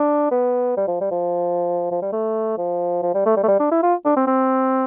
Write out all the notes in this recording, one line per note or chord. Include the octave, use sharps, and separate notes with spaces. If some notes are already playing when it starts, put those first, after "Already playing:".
Already playing: D4
B3
G3
F3
G3
F3
F3
G3
A3
F3
F3
G3
A3
G3
A3
G3
D4
E4
F4
D4
C4
C4